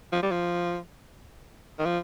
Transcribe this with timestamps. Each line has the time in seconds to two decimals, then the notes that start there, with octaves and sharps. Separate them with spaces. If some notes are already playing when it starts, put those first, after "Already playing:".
0.12 F3
0.23 G3
0.31 F3
1.79 D#3
1.85 F3